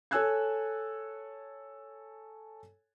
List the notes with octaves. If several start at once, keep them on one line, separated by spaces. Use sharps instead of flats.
A4 C#5 G#5 E6 F#6 G#6